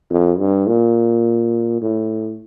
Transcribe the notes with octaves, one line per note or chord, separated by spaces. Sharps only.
F2
G2
A#2
A2